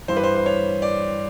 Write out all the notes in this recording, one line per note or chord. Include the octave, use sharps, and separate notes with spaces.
G2 E3 G3 C5
B4
C5
C5
C#5
D5